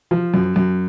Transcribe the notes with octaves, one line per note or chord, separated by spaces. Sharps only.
F3
F#2
F#2